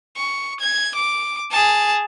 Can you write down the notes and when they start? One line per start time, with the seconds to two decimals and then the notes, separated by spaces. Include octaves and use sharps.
0.16 C#6
0.60 G#6
0.95 D6
1.51 G#4 A5